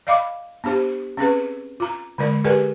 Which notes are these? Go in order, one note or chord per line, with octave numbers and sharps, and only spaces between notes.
D5 D#5 F5 B5 D6
B3 D4 G4 C5
C4 C#4 G#4 B4
F4 A#5
D3 G#3 A#4 D5
G4 G#4 A#4 B4 D5 G#5